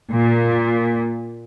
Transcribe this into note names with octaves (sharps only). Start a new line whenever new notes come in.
A#2